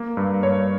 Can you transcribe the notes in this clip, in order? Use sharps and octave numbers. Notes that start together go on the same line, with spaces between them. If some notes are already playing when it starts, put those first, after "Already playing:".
Already playing: A#3
G2
G2 C#5